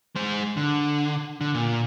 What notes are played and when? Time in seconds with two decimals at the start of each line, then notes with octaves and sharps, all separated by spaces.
0.16 G#3 C5
0.57 D3
1.41 D3
1.54 A#2